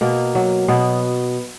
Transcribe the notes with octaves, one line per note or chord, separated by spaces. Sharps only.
B2 A#3
F#3
B2 B3